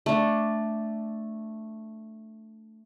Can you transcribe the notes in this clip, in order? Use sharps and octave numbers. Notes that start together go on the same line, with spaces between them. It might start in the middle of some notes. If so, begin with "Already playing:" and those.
A3 D4